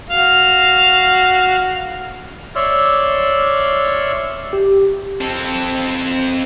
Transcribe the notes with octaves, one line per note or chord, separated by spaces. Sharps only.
F#4 F5
C#5 D5 E5 C6 E6 F6
G4
C4 A4